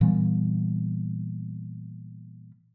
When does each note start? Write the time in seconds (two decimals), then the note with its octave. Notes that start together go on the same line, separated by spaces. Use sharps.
0.01 A#2 E3 G3 B3